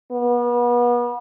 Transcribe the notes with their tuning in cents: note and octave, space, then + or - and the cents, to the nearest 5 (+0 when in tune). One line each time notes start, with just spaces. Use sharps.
B3 -35